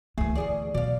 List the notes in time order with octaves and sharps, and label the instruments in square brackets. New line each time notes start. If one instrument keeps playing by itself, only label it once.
[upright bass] D2 E3 [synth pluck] A3 [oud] G#4
[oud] B2 G#4 D5
[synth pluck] B2 [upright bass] D#3 F#3 [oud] D5 F5